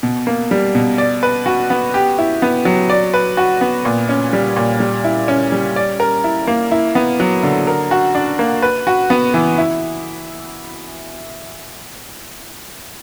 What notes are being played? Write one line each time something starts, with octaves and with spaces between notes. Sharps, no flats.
B2
A#3
G3
B2
D5
B4
F#4
B3
G4
E4
B3
F#3
D5
B4
F#4
B3
A#2
C#4
G3
A#2
G3
E4
C#4
G3
D5
A#4
E4
A#3
E4
B3
F#3
D3
A#4
F#4
D4
A#3
B4
F#4
B3
E3
E4